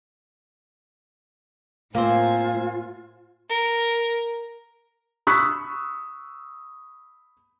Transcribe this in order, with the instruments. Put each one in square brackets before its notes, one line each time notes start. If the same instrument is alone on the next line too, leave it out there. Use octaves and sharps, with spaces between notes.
[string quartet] A2 C5 G#5 [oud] A#3 C4 [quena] F4
[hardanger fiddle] A#4
[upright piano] B5 C#6 D#6 E6 F#6 B6